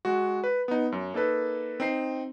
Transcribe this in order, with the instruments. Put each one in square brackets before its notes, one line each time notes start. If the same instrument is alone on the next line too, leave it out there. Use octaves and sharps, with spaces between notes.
[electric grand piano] G#3 F#4
B4
B3 D#4
F#2
A#3 D#4 A4 B4
C4 D#4 C7